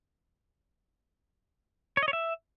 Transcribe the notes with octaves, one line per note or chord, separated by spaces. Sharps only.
C#5
D#5
C#5
E5